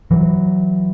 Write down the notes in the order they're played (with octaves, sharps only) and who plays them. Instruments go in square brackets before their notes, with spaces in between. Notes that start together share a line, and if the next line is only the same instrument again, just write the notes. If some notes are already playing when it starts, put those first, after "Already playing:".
[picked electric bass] E3 F#3